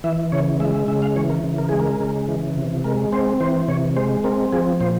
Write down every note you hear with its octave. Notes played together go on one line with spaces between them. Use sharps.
E3 E5
C#3 C#5
G#3 E5
E5
C#3 E5
F5
E3 C#5
A#4
C#3
A#4
G#3 G#4
A#4
C#3
E3
C3
G#3 A#4
C4 C5
E3 C5
C3 C#5
G#3 C5
C4 A#4
F3 G#4
A#2 C5